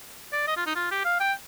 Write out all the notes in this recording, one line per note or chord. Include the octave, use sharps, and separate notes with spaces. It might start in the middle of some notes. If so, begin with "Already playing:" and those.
D5
D#5
F4
D#4
F4
G4
F5
G5